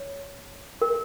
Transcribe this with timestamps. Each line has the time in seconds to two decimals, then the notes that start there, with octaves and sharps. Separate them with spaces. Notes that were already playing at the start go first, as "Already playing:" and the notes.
Already playing: C#5
0.82 A#4